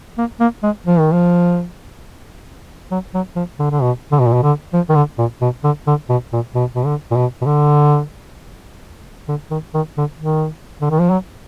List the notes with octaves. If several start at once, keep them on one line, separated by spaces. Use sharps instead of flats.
A#3
A#3
G#3
F3
D#3
F3
F#3
F#3
F3
D3
D3
B2
D3
B2
A#2
B2
D3
F3
D#3
D3
A#2
B2
D3
D3
B2
A#2
B2
B2
D3
A#2
B2
B2
D3
D3
D#3
D#3
D3
D#3
D3
D#3
F3
F#3